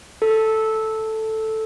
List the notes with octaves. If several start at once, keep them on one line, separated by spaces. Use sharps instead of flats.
A4